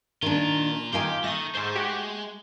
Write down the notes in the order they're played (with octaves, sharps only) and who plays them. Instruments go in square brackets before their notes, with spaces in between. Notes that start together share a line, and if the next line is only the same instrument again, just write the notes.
[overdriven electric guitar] A#2 F4 [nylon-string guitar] D#3 D4
[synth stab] D#3 G5 [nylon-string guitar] F4 F5 G#5 [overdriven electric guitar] G4
[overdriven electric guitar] D#3 [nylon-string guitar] A3 [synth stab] D#6 A#6
[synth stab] G#2 C5 [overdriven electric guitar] G#3
[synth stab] F#4 G4